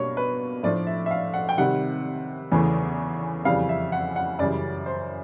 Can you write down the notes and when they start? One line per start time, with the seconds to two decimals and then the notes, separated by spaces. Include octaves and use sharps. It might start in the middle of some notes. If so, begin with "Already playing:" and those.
Already playing: B2 G3 A#3 D4 C#5
0.17 B4
0.63 A2 F3 A3 D4 D5
0.87 E5
1.06 E5
1.11 F5
1.34 F#5
1.49 G5
1.58 C3 D#3 G3 F#5
2.52 E2 C#3 E3 A3
3.45 F2 C#3 E3 G3 F5
3.69 E5
3.92 F#5
4.16 F#5
4.39 F#2 C#3 E3 G3 D5
4.86 C5